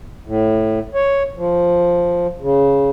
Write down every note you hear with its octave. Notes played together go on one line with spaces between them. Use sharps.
A2
C#5
F3
C#3